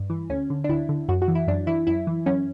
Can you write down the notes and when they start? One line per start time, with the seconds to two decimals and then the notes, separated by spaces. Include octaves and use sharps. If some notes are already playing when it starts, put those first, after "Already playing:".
Already playing: G2
0.10 E3
0.30 D2 C#4
0.50 D3
0.64 D4
0.69 D2 E4
0.89 D3
1.08 F#2 F#4
1.22 F#4
1.28 E3
1.35 E4
1.47 F#2 D4
1.67 E3 E4
1.87 F#2 E4
2.07 E3
2.26 F#2 C#4